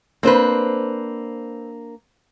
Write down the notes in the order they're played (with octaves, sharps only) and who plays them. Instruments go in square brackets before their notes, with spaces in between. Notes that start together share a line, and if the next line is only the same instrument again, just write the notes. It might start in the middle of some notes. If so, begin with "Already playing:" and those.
[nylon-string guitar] A#3 D4 C5 [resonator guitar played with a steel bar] C4 B4